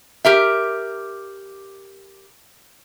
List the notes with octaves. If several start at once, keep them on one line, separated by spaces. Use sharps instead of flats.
G4 A#4 E5